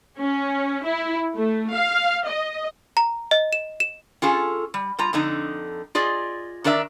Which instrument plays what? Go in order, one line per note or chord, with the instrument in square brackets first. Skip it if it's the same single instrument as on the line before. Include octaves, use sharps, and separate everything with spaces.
[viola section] C#4
E4
A3
F5
D#5
[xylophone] A#5
D#5
E7
E7
[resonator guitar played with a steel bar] C#4 F4 G#4 A4
G3
G3 F4 A#5
F2 D3 D#4
F4 G#4 D5 D#5
D#3 D4 A#4 D5 E5